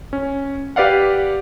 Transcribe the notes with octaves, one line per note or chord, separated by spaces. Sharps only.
C#4
G4 B4 D5 F5 F#5